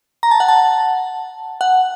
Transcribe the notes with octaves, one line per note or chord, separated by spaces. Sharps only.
A#5
A5
F#5
A5
F#5